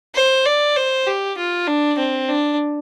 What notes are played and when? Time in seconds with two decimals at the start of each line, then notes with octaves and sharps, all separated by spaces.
0.15 C5
0.46 D5
0.76 C5
1.07 G4
1.37 F4
1.67 D4
1.98 C4
2.29 D4